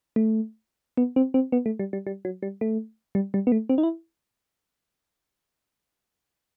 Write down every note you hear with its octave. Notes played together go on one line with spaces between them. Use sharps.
A3
B3
C4
C4
B3
A3
G3
G3
G3
F#3
G3
A3
G3
G3
B3
A3
C4
D#4
E4